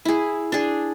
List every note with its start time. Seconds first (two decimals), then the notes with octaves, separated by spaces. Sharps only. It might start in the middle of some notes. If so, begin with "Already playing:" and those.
0.05 E4 G#4
0.52 D4 G#4